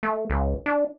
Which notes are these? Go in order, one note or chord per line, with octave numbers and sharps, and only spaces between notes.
A3
C#2
D4